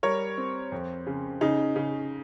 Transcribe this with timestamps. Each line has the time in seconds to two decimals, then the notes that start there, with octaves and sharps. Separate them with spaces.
0.03 G3 A#4 C#5
0.38 C4
0.72 F2
1.07 C#3
1.41 C#3 D#4
1.76 C#3